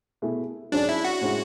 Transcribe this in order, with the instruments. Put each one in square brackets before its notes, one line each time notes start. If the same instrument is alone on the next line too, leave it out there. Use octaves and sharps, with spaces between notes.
[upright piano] B2 A3 E4 G#4
[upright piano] G#2 F#3 C#4 G#4 D5 [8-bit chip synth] D4
[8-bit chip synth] E4
F#4
[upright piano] A2 G#3 C#4 E4